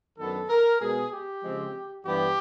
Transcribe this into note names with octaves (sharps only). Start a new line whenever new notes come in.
F#2 D#3 F#3 B3 D4 A4
A#4
B2 G#3 B3 G#4
G4
C#3 F3 G#3 C4
G2 E3 G3 B3 D4 G4